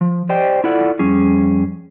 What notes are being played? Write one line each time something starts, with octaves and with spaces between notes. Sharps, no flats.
F3
G4 C5 D5 D#5 G5
E4 F4 A4 D5 F#5
F2 G3 C#4 G#4